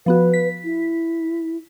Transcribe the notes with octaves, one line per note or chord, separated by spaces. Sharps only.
F3 B3 F#4 B4
B6
E4